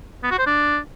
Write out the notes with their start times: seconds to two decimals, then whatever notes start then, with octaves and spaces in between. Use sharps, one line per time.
0.23 B3
0.31 F#4
0.39 C5
0.47 D4